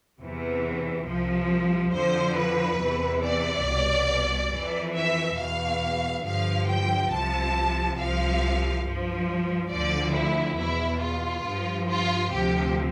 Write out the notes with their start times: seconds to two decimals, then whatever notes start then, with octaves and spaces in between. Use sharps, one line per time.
0.20 E2 C3 E3
1.06 C2 C3 F3
1.92 F2 D3 F3 C5
2.35 B4
2.79 E2 C3 E3
3.22 D5
3.65 C2 B2
4.52 F2 E3
4.95 E5
5.38 E2 B2 F5
6.24 G2 D3 F3 F5
6.68 G5
7.11 C2 C3 F3 A5
7.98 C2 C3 F3 F5
8.84 G2 F3
9.70 D2 D3 F3 D5
10.13 E4
10.57 E2 B2 E4
11.00 F4
11.43 G2 F3
11.87 F4
12.30 D2 C3 F3 G4